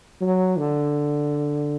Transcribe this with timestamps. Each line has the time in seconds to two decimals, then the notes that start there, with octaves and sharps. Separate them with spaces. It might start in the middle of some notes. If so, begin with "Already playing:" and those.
0.21 F#3
0.58 D3